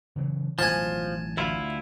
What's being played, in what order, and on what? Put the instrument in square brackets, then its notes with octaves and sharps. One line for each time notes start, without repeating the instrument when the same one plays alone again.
[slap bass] C#3 E3 F#3
[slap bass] A1 B2 F#3 [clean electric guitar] F3 [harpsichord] G#5 A5
[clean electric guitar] D2 E4 F4